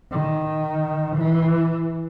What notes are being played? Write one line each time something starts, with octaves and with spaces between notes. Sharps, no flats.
D#3
E3